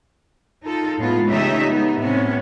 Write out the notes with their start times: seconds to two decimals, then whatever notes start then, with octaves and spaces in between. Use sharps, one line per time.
0.64 D#4 F4 A4
0.98 A2 G#3 B3 F4
1.28 C#3 A3 D#4 G4 E5
1.69 B3 D#4
1.98 A2 C3 B3 C#4